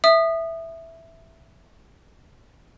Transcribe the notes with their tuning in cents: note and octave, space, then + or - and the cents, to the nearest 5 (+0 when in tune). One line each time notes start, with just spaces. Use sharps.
E5 +0 D#6 -25